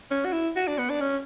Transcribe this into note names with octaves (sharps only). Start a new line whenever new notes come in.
C#4
F#4
E4
F#4
D4
B3
D4
C#4